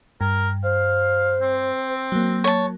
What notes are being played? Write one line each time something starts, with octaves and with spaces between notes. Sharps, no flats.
G2 A#4
C5 F5
C4
F#3 A#3
C#5 A5